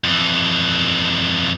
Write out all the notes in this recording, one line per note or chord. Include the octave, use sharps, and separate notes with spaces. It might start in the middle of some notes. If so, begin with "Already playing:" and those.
F2 E3